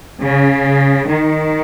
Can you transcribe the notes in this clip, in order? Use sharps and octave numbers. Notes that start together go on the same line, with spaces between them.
C#3
D#3